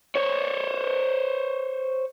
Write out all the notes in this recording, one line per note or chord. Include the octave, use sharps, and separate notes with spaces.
C5 C#5